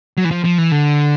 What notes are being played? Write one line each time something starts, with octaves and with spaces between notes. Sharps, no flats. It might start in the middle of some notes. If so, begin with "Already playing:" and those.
F#3
E3
F3
F3
E3
D3